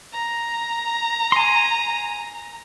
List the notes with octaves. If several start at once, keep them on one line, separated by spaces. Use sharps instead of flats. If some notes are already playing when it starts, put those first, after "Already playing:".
A#5
G#5 C6